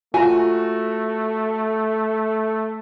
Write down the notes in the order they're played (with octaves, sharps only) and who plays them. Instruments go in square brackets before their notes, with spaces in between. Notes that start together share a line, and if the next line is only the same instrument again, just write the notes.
[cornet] A3 [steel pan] F4 A#5 [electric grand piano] F#4 [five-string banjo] G#5